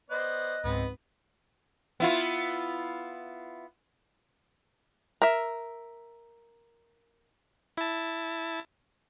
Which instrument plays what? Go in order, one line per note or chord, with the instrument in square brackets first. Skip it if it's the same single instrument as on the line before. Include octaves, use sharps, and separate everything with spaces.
[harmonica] B3 C5 D5 [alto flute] D#5 [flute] F#6
[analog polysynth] C#2 G#2 C4 [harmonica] B3 B4
[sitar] B3 E4 F4
[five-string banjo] A#4 E5
[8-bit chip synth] E4 A5